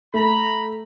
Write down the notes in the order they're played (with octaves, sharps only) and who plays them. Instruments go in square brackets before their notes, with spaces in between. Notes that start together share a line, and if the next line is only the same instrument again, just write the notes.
[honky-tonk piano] A3 [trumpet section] A#5 B5